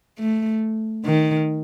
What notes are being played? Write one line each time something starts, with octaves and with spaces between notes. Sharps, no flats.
A3
D#3